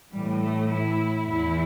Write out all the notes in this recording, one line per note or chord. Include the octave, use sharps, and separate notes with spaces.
A2 E3 G3
A3
E4
E2 E3 E4